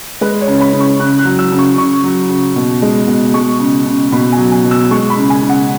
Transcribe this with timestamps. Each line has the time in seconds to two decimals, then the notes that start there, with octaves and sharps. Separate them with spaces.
0.21 G#3 B4
0.41 C#5
0.48 C#3
0.61 B5
0.73 C#3
0.80 C#6
0.99 C#3 F#6
1.18 F#6
1.25 F#3
1.39 E6
1.52 C#3
1.59 C#6
1.78 C#3 C#6
2.04 F#3
2.29 C#3
2.56 B2
2.82 G#3
3.07 B2
3.34 G#3 C#6
3.60 C#3
3.86 C#3
4.12 B2 B5
4.32 G#5
4.38 F#3
4.52 G#5
4.64 B2
4.71 E6
4.91 G#3 C#6
5.10 B5
5.17 C#3
5.30 G#5
5.43 C#3
5.49 F#5